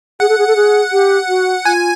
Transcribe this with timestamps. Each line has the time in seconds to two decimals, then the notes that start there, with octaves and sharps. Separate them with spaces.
0.20 G#4 F#5
0.29 A4
0.38 G#4
0.47 A4
0.56 G#4
0.92 G4
1.28 F#4
1.65 F4 G#5